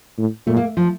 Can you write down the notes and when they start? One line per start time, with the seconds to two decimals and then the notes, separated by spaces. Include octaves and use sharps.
0.18 A2
0.47 A#2 A3
0.57 A#3
0.77 F3